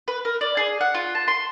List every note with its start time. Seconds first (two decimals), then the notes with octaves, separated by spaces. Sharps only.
0.08 B4
0.25 A#4
0.41 D5
0.57 G#4
0.81 F#5
0.94 F4
1.15 A5
1.28 C6